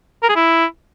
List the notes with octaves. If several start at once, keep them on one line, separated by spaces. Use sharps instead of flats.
A#4
G#4
E4